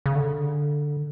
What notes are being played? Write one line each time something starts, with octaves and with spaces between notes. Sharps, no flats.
C#3
D3